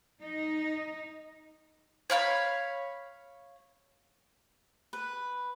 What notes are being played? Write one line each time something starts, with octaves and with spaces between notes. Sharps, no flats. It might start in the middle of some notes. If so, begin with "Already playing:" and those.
D#4
C#5 F5 B5
B4